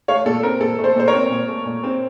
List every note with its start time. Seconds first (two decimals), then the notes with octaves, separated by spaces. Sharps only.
0.08 A3 C#5 F5
0.25 A#2 A4
0.43 C4 A#4
0.61 A#2 A4
0.78 A3
0.84 A4 C5
0.96 A#2 C5
1.08 A#4 C#5
1.13 C4
1.31 A#2
1.48 A3
1.65 A#2
1.84 C4